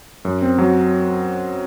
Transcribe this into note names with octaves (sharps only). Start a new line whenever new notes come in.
F#2
C4
F#3